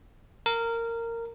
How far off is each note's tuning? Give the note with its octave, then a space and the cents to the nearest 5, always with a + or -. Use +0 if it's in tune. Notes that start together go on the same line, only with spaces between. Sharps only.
A#4 -15